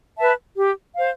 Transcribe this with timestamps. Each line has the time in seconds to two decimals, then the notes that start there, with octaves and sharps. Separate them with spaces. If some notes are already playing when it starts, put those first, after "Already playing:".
0.16 B4 E5 A5
0.56 G4
0.96 C5 F5